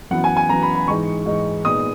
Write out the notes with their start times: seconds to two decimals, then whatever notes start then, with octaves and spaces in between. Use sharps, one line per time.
0.10 F#2 E3 B3 F#5
0.24 G#5
0.37 G#5
0.49 F#2 E3 B3 A#5
0.62 B5
0.75 B5
0.87 G#2 E3 G#3 D#4 C#6
1.26 G#2 E3 G#3 D#4
1.64 A#2 G#3 B3 D#4 D#6